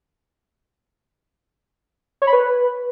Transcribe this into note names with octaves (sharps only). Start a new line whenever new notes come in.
C#5
B5
B4